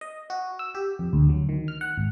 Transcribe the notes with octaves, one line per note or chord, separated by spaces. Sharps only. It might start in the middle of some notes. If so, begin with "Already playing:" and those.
D#5
F#4
E6
G4
F2
D2
F#3
D#3
F6
F#5
G#1